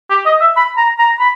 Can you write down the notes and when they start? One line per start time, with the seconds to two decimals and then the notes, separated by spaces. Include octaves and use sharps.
0.10 G4
0.26 D#5
0.41 E5
0.57 B5
0.77 A#5
0.99 A#5
1.20 B5